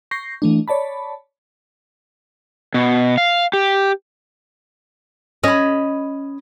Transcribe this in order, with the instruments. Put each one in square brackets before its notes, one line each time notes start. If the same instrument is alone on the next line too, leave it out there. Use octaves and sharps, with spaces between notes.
[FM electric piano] C#6 G6 A#6 C7
E3 A3 D4
C#5 D5 A5 B5
[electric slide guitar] B2
F5
G4
[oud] C#4 [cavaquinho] D#5 B5